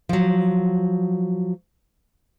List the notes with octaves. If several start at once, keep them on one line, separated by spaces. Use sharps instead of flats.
F3 F#3